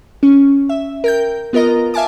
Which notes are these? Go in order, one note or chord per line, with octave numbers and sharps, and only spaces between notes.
C#4
E5
A#4 G5 G6
B3 F4 A#4 D#5 A#5
E5 F5 G#5 A5 D6